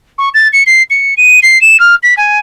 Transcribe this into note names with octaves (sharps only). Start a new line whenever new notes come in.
C#6
A6
C#7
C7
C#7
D#7
C7
E7
F6
B6
G#5